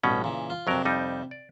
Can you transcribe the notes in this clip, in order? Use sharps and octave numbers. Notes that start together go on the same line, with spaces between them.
A1 G2 B2 C#4
A#2 C#3 E3
F4
F2 C3 F#3 D4 A#4
F2 G3 D#4
D5